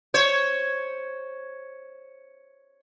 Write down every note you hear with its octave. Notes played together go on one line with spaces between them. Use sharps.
C5 C#5